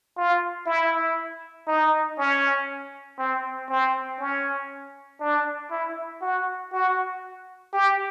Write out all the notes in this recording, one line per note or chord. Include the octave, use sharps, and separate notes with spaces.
F4
E4
D#4
C#4
C4
C4
C#4
D4
E4
F#4
F#4
G4